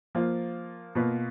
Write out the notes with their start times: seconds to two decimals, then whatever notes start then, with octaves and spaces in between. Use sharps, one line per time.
0.15 F3 A#3 F4
0.95 B2 A#3 F4 B4